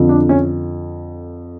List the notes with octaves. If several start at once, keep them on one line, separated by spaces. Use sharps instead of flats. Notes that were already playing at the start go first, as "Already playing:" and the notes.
Already playing: F2 D3 F3
D4
C#4